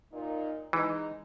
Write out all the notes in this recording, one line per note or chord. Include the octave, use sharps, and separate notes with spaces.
A#2 D#4
E3 G#3 D#4